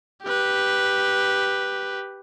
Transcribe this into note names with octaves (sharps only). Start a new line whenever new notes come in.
G4 B4